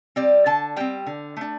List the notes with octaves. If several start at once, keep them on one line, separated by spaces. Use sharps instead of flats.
G3 C4 D5
D3 A5
G3 C4 G5
D3
A3 D4